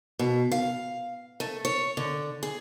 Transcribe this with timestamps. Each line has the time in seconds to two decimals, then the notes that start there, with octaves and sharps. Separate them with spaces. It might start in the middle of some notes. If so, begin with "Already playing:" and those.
0.19 B2
0.52 F5
1.40 A3
1.65 C#5
1.97 D3
2.43 G#4